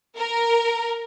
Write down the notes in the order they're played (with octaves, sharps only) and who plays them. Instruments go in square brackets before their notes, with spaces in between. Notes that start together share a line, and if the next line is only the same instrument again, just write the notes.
[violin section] A#4